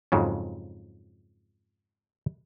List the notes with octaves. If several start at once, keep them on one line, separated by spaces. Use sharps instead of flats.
F2 G#2 C#3 F#3